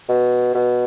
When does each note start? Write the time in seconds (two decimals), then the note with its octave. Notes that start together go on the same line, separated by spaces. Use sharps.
0.09 B2
0.55 B2